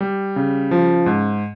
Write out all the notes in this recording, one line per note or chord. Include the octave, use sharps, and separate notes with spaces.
G3
C#3
F3
G#2